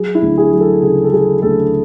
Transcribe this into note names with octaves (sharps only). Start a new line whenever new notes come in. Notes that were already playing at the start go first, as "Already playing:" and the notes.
Already playing: F#3 G#4
E4
D2
G#4
F#3
A4
C#3 G#4
A4
F#3 G#4
D2 A4